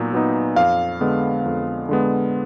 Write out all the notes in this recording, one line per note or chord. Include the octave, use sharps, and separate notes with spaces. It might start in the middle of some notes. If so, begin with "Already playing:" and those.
Already playing: A#2 F#3 B3 D#4
F#3 B3 D#4
F2 F5
D3 G#3 B3
F2
D3 G#3 B3